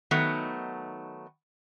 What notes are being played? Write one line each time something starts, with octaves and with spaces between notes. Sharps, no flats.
D#3 F#3 A3 B3 D#4